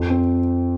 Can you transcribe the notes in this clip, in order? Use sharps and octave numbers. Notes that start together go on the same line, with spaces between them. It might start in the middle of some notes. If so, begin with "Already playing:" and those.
Already playing: F2
C4